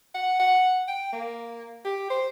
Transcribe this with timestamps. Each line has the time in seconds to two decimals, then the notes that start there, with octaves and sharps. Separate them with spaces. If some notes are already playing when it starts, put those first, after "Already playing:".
0.14 F#5
0.40 F#5
0.88 G5
1.13 A#3
1.85 G4
2.10 C5